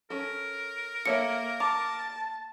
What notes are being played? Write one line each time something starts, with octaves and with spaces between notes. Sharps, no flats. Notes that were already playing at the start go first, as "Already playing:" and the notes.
C#4 A4 A#4
A#3 A4 C#5 E5 C#7
A5 A#5 D6